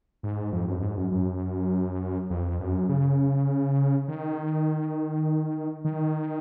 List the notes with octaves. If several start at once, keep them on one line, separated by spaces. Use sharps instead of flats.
G#2
F2
F#2
G#2
F#2
F#2
F2
F#2
C#3
D#3
D#3